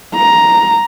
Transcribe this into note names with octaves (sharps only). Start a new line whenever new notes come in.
A#5